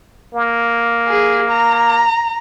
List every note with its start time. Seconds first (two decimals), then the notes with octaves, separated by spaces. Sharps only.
0.34 A#3
1.08 G#4
1.50 A#5